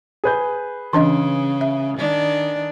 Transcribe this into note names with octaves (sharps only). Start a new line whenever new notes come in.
G#4 B4 G6
C#3 E3 D4 D#5
E5
D#3 D4